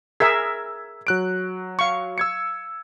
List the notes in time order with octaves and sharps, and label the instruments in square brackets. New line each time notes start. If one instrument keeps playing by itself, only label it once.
[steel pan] G#4 A#4 E5 [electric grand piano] E6 G#6 B6
[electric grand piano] F#3 F#6 D7
[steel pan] F5 C#6
[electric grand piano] E6 G#6 C#7